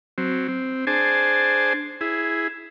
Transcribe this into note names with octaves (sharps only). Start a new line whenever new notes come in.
F#3 C4
C4
D4 G#4 C5 G#5 A5
E4 G#4